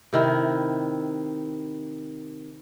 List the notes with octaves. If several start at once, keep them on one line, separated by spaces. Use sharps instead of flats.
C3 D#3 E4